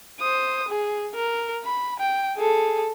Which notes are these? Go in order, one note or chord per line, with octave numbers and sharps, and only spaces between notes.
C5 D#6
G#4
A#4
B5
G5
G#4 A4